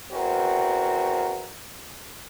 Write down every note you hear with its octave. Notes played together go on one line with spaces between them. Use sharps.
E2 C4 F#4 A#4